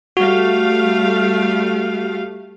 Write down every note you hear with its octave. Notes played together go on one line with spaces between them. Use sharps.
G3 A3 F#4 F5